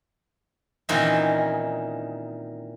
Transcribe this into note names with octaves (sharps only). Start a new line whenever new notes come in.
A#2 D#3 E3 C4 C#4 D#4